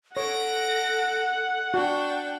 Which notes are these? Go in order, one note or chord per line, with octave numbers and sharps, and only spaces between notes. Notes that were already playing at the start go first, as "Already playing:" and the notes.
A4 C#5 F#5 A#6 D7
D4 F#4 G5